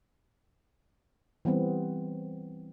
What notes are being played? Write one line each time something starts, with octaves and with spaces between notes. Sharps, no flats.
E3 G3 B3 C4